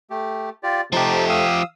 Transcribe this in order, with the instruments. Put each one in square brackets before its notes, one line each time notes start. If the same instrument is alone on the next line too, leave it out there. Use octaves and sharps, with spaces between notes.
[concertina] A3 G4
F4 G4 D5
[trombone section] C3 A3 [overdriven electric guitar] F3 G4 [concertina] D#4 A5
[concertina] F5 D#6 E6